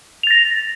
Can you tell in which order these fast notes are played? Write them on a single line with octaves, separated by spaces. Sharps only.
F7 A6 A#6